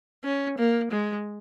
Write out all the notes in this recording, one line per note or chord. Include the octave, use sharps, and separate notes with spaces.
C#4
A#3
G#3